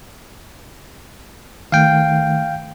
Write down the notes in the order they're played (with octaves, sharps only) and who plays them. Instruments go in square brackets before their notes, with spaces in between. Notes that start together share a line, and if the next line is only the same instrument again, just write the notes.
[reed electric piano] D#3 A3 [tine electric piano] F5 G5